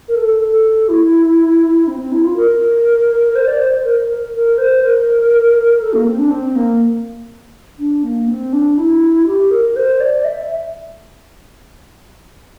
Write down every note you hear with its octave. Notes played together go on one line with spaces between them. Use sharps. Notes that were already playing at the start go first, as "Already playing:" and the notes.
A#4
A4
A4
E4
C4
C4
E4
F4
A#4
C5
D5
C5
C5
A#4
A#4
C5
A#4
A4
A#3
C4
D4
C4
A#3
D4
A#3
C4
D4
E4
G4
A#4
C5
D5
E5